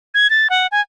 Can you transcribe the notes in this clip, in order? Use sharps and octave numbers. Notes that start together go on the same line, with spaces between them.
G#6
A6
F#5
G#5